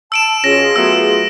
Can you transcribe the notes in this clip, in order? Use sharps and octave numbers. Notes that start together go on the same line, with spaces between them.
A5 E6 D7 E7
B2 C#4 F4 G#4 A#6
F#3 A3 B3 E6